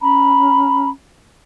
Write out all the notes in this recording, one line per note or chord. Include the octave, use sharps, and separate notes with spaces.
C#4 A#5 B5